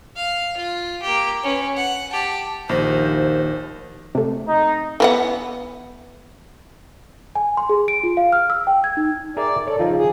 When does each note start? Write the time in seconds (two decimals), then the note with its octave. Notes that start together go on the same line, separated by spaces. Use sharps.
0.16 F5
0.57 F4
1.03 A#3 G4
1.43 C#4 B4
1.76 F#5
2.12 G4 A5
2.69 A#1 D#2 C5
4.15 C3 A3
4.48 D#4
5.00 E3 B3 F#5
7.35 G#5
7.57 C6
7.69 G#4
7.88 D7
8.04 F4
8.17 F5
8.33 F6
8.50 E6
8.67 G5
8.84 G#6
8.97 D#4
9.37 G#4 A#4 D5 E5
9.67 A4 C#5 D5
9.79 C#3 F3 D#4 F4
9.96 G#4